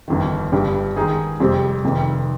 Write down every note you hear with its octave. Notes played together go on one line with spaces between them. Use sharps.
G1 F2 D#3
G1 G2 G3
D#3 G#3 D#4 G#4
F2 C3 G3 C4 G4
F1 F2 C3 D#3